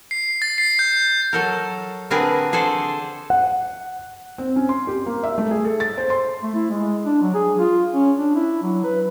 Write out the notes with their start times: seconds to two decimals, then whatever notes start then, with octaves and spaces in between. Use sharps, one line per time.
0.11 C7
0.42 A6
0.58 C7
0.79 G6
1.33 F#3 A4 A#4
2.10 D3 C4 D4 G#4 A#4 B4
2.52 D3 G#4 A4 C5 D5
3.30 F#5
4.38 C4
4.56 C#4
4.69 C6
4.87 G4
5.06 A#3
5.23 E5
5.38 A3
5.51 G#4
5.65 A4
5.80 A6
5.98 C5
6.10 C6
6.43 A3
6.55 E4
6.70 G#3
7.06 D4
7.22 F#3
7.35 G#4
7.59 F4
7.94 C#4
8.18 D4
8.35 E4
8.63 F#3
8.84 B4